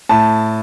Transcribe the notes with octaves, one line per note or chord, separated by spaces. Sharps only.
A2 A5